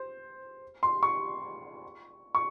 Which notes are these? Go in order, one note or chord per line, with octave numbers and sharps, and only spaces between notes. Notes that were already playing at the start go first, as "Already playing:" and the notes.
Already playing: C5
C6
C#6
C#6